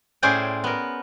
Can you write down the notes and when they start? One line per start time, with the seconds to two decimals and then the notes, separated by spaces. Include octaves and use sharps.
0.23 A2 C#4 G#4 C5 D5 G5
0.64 B3 A#4